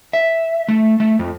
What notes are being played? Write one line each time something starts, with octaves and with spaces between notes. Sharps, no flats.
E5
A3
A3
F2